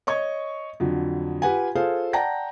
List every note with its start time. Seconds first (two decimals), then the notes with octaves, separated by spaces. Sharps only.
0.07 C#5 D#5 C#6 G#6
0.80 F2 D3 F#3
1.42 F4 G4 B4 F#5 G#5
1.75 F4 G#4 A4 C5 F5
2.13 D5 F#5 G5 A5 A#5 A#6